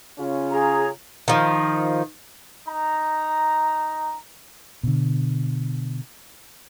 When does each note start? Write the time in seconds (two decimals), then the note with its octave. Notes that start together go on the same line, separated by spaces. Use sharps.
0.19 C#3 C#4 F4
0.51 G#4 A#5
1.28 D#3 F3
2.69 D#4 A#5
4.83 B2 D3